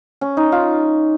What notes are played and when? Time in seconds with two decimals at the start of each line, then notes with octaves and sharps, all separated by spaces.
0.21 C#4
0.37 D#4
0.52 F4